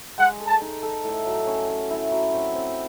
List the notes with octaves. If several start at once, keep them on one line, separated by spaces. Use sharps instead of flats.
G#3 F#5
A4
A5
D#4
A4
A2
F#3
C#4
C#4
E4
F#3
C4
C4